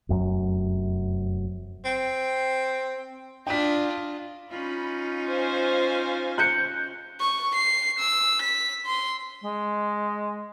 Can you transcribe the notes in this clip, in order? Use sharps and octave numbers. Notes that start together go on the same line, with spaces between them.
F1 F#2 C3 F#3
C4
D4 F4 D#5 G5 B6
C#4 D#4 F4 B5
C5 F5 G#5
F#6 G6 C#7
C#6
C7
E6
B6
C6
G#3